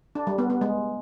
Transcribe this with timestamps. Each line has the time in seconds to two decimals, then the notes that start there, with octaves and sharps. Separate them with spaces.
0.15 D4
0.27 G3
0.38 B3
0.50 B3
0.61 G#3